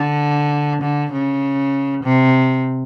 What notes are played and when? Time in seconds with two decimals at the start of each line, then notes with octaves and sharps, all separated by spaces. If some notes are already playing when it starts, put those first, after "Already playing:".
Already playing: D3
0.82 D3
1.12 C#3
2.04 C3